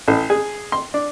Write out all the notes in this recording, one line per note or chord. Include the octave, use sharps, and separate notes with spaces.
A1
G#4
C6
D4